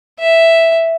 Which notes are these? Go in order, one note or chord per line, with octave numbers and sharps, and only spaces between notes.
E5